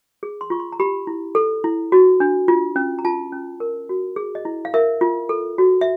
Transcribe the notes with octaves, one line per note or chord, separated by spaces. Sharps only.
G#4
C6
F4 C#6
C6
A#5
G4 B5
E4
A4
E4
F#4
D4
F4
C#4
A#5
F4 A5
C#4
A#4
F#4
G#4
D#5
E4
F5
A#4 E5
F4
A4
F#4
E5